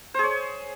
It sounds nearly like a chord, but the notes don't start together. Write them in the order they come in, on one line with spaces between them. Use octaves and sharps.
C5 G#4 C#5